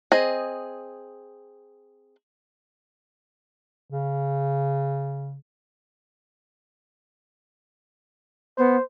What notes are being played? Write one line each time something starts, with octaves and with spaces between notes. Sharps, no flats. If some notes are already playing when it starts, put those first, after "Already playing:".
C4 G#4 D#5
C#3
B3 C5